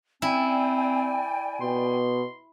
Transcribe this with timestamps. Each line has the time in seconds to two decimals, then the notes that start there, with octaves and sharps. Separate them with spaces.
0.22 C4 E4 D5 G5 G#5
1.61 B2 C6